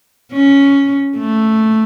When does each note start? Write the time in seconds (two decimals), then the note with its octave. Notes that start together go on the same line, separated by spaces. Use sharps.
0.32 C#4
1.18 A3